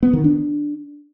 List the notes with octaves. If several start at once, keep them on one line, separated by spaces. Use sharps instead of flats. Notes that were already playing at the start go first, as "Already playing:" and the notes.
B3
D#3
D4